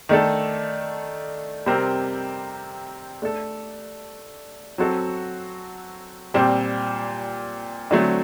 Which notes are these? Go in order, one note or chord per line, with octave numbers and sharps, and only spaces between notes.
D#3 A3 D4 A4
C3 G3 C4 G4 A#4
A3 D4 A4
F#3 C4 F#4 A4
A#2 G3 C4 G4
D3 F#3 A3 C4